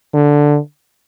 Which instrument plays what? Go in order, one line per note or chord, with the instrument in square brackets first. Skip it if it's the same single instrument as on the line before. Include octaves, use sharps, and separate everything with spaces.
[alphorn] D3